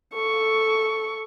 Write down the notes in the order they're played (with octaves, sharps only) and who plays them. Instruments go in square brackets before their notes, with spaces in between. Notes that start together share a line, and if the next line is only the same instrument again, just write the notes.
[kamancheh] A4 C#6